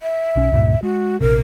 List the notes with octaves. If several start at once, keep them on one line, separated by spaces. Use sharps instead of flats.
E5
B1 C#4
C#2 G2 A#2
G#3 F#4
A#1 C3 A#4